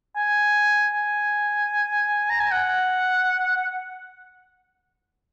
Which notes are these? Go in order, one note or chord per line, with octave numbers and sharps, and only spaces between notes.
G#5
G#5
A#5
G#5
F#5